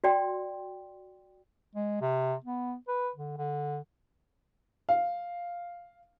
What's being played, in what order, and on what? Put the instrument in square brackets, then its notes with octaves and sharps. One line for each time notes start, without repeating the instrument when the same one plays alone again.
[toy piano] F#4 D5 G5 C6
[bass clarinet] G#3
C3
B3
B4
D3
D3
[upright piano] F5